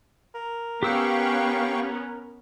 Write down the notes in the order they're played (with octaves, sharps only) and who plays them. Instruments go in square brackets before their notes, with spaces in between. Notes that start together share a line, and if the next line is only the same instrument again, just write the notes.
[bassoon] A#4
[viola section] B3 C#4 [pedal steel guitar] G4 E6 [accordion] F5 G5 C#6